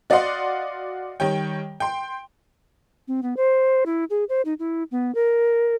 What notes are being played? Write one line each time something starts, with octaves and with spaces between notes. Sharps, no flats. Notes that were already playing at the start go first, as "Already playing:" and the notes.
F#4 D5 D#5 F5 F#5 C6
D#3 G3 C#5 G5
G5 C6
C4
B3
C5
E4
G#4
C5
D#4
E4
B3
A#4